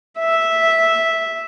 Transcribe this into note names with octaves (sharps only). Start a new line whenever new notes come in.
E5